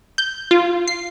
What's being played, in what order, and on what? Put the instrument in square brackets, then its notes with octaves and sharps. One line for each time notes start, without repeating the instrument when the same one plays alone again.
[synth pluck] G6
F4
C7